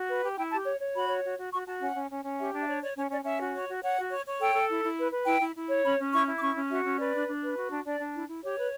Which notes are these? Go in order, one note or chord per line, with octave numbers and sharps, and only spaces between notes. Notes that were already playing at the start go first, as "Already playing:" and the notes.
Already playing: F#4
B4
G4
E4 G5
G4 A5
C#5
C#5
F#4 B5
C#5
F#4
F#4
F#4 C#6
F#4 A5
C#4 F#5
C#4
C#4
C#4
G4 E5
D4
E5
C#5 D5
C#5 D5
C#4 C#5
C#4 D5
C#4 E5
F#4
C#5
F#4
C#5 F#5
F#4
C#5
C#5
A4 G5
A4
E4
E4
B4
B4
E4 G5
E4
E4
C#5
C#4 B5
C#4
E4 C#6
E4
D6
C#4 C#6
C#4
F#4 E5
C#4
B4 D5
D4
D4
B4
F#4
D4
D4 D5
D4
E4
E4
G4 C#5
B4